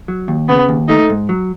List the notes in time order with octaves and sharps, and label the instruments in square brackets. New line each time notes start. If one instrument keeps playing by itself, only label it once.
[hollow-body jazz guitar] F#3
D#2
[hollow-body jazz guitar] C#3 [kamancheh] B3
[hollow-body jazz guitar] D#2
[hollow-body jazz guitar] A3 [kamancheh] D#4
[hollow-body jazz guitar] G#2
F#3